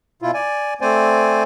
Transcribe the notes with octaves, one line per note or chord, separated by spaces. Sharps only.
B2 E4 F4
D5 G#5
A3 C4 C5 D5 G#5